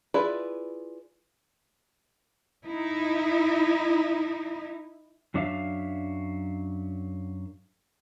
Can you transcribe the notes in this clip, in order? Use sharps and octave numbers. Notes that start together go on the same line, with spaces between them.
E4 F4 G#4 B4 D5
D#4 E4
F#2 F#3 D4 C#5 E5 F5